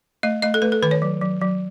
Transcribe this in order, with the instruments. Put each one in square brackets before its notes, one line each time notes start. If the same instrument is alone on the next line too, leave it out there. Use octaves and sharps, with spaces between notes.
[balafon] A3 D#5
A3 D#5
A4
A3 B4
A4
D#3 B4
C#5
F#3
F#3
F#3